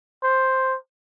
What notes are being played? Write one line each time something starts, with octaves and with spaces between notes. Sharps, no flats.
C5